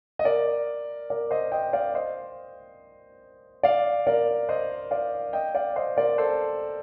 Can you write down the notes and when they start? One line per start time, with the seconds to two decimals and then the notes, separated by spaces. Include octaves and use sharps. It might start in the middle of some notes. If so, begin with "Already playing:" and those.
0.19 D#5
0.24 A#4 D5
1.10 A#4 D5
1.31 C5 D#5
1.52 D#5 G5
1.73 D5 F5
1.94 C5 D#5
3.63 D5 F5
4.07 A#4 D5
4.49 C5 D#5
4.91 D5 F5
5.33 D#5 G5
5.55 D5 F5
5.76 C5 D#5
5.97 A#4 D5
6.18 A4 C5